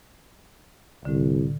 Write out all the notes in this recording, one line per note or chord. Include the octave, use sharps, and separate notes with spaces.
C2 A2 D3